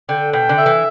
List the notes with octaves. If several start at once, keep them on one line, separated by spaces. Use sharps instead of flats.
D3 G5
B2 G5
D3
E5
E3